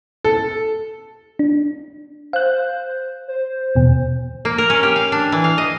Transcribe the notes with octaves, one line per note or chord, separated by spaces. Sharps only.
A4
D4
C5 F5 F#6
C5
E2 B2
A#3
A#4
C#4
G4
F5
D4
E3
F5
D#5